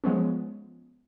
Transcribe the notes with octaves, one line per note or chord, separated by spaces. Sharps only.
F3 G#3 B3 C#4